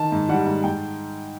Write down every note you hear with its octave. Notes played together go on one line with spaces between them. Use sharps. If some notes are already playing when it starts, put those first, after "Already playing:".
Already playing: D#3 A5
G#2
G3 F#5
G#2
G#2 G5